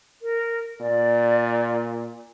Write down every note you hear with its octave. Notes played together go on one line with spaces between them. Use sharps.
A#4
A#2 D5